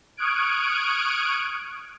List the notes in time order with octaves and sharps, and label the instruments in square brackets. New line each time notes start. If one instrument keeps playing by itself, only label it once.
[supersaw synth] C#6 D#6 F6 F#6 G#6 D7